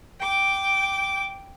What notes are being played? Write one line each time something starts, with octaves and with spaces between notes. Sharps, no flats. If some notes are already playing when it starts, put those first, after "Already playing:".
G5 D6